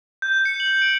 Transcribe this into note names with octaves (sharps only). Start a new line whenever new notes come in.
G6
C#7
F#7
D7